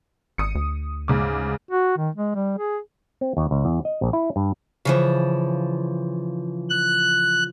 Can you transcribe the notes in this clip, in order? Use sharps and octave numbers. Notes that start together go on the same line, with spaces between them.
G#1 D#6 C#7
D2
G#2 C#3 D6
F#4
D#3
G#3
G3
G#4
C4
D#2
C#2
E2
D#5
A#1
E4
G2
C#3 E3 F3
F#6